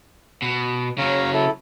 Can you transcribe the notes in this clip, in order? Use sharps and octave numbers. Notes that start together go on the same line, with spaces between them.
B2
C#3 F#3 C#5 F5 A#5
E4 A4